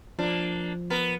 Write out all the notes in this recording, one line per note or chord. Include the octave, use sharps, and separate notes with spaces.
F3 A#3 D4
B3 A#4